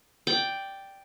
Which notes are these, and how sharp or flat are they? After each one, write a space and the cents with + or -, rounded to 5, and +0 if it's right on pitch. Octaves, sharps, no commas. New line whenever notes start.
D5 +0 G5 +0